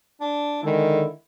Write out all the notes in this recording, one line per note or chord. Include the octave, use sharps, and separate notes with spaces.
D4
D3 D#3 G#3 E4